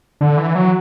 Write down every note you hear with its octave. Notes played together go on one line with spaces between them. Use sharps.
D3
E3
F#3